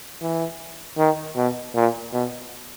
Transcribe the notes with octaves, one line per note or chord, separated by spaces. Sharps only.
E3
D#3
B2
A#2
B2